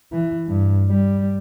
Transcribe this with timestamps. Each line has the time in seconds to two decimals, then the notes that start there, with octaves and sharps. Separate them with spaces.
0.12 E3
0.48 G2
0.89 G3